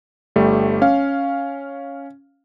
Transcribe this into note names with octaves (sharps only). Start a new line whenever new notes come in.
G1 G3 A3
C#4 F5